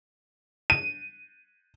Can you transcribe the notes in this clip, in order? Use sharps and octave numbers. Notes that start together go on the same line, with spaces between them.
D#7